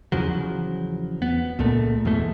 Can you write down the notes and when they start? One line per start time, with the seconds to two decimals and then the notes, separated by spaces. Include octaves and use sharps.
0.12 E2 C#3 F3 F#3
1.22 B3
1.59 C#2 A#2 A3
2.05 E2 G#2 B2 A3